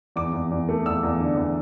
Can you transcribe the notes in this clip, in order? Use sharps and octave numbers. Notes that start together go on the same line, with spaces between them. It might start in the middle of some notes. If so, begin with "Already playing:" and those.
E2 D6
E2
E2
A3
E2 E6
E2
D3
E2